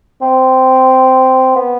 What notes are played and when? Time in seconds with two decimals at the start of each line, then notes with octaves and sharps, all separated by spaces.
0.22 C4
1.56 B3